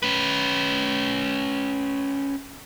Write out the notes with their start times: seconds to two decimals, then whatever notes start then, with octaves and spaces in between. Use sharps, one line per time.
0.03 C#4 B4